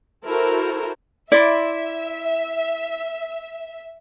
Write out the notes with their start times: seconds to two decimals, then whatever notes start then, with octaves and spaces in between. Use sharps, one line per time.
0.25 E4 F#4 A4 A#4 C5
1.32 E4 D5 E5 C6 D6